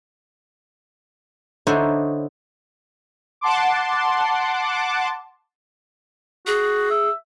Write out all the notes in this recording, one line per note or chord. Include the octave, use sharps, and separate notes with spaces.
D3 D#4 E4 C5 C#5
F#5 A5 C6 D6
F#4 G#4
E5